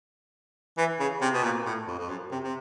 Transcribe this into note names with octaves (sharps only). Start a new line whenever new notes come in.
E3
C#3
C3
B2
A#2
A2
F2
F2
F#2
C3
C3